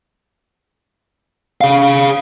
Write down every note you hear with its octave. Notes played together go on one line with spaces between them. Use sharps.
G#4 F5